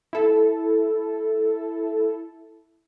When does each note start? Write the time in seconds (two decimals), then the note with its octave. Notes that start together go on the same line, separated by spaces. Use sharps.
0.13 E4 A4